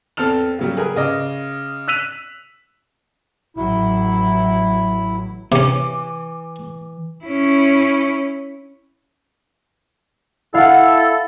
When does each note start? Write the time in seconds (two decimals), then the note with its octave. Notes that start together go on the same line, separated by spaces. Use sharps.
0.17 E2 C4 A4 F6 F7
0.59 C#3 F#3 G3
0.77 G#4 A#4 B4
0.96 C#3 D#5 D6
1.88 E6 F#6 B6 D#7 F7
3.57 A1 F#3 E4
5.52 C3 E3 C#4 D6
7.24 C#4 E4
10.54 E4 A4 F5 F#5